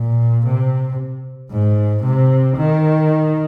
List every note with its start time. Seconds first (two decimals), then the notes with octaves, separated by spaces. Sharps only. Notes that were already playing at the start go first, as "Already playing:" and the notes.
Already playing: A#2
0.46 C3
1.51 G#2
2.03 C3
2.57 D#3